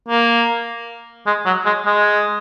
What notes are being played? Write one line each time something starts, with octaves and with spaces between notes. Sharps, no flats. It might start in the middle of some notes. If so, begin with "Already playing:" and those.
A#3
G#3
F#3
G#3
G#3